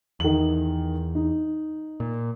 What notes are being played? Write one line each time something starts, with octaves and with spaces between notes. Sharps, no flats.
E2 D#3 F#7
D#4
A#2